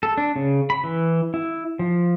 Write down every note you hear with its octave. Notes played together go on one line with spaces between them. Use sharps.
A4
D4
C#3
B5
E3
E4
F3